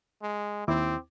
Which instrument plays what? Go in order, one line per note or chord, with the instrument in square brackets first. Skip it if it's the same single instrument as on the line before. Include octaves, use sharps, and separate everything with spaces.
[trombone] G#3
[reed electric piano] D#2 E4 D6 [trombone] C4